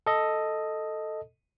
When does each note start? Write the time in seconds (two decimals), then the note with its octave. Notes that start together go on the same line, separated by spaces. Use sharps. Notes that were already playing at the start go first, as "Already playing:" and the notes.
0.06 A4 D#5